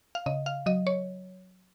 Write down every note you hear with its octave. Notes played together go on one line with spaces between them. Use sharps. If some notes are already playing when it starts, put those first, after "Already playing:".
F5
C#3 D#5
F5
F#3 D#5
C#5